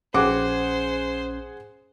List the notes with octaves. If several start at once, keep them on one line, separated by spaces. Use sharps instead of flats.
A#1 C#4 G#4 C5 F#5 D6